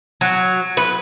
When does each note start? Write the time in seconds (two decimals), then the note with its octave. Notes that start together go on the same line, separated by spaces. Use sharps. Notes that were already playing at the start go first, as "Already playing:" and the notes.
0.21 F#3
0.77 B4